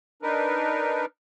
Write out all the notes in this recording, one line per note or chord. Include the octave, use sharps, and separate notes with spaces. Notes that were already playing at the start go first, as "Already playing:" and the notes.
D4 D#4 A#4 B4